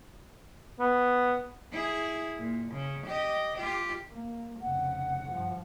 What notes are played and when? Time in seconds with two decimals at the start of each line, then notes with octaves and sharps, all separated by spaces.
0.80 B3
1.72 E4 G#4
2.39 A#2
2.72 C#3
3.07 G4 D#5
3.57 F4 G4
4.11 A#3
4.61 F1 C#3 F#5
5.29 G2 F3